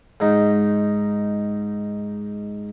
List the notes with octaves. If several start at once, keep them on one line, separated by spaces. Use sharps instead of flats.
G#2 D#4